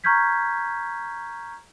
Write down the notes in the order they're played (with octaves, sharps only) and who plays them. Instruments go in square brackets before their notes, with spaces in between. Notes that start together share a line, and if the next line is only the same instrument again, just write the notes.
[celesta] A#5 C#6 F6 G6 G#6 B6